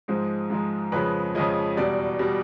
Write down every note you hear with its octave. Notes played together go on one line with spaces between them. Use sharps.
G#2 F3 G#3 C5
G#2 F3 G#3
F2 C#3 F3 G#3 B4
F2 C#3 F3 G#3 D#5
E2 B2 G3 D5
B2 G3